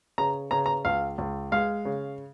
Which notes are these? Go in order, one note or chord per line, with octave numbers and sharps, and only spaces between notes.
C#3 A#5
C#3 A#5
A#5
C#2 F5
C#2
G#3 F5
C#3